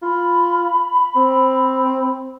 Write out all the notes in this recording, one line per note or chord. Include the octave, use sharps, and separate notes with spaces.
F4 B5
C4